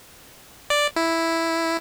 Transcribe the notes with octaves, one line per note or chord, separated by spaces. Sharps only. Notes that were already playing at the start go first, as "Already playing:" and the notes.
D5
E4